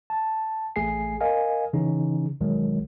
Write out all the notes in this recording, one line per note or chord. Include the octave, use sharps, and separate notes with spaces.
A5
A1 A3 G#4 G#5 C7
A#4 D#5 F5 G#5
C#3 E3 C#4 D#4
B1 D#3 F#3 G#3